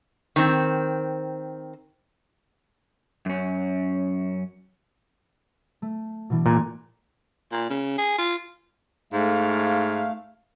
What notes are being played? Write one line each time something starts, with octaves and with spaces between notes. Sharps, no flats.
D#3 C4
F#2 C#4
A3
B2 E3 D4
A#2 G#5 A#5 F#6
A#2
C#3
G#4
F4
G#2 A3 F5